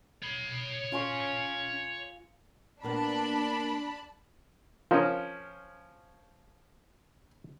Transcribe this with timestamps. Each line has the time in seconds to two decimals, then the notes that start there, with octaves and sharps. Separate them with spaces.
0.23 C#5 B5
0.92 C#4 F4 G#5 C#6
2.83 A#2 A#3 B3 D4 A5 B5
4.91 F3 C#4 F4 A#4 D#5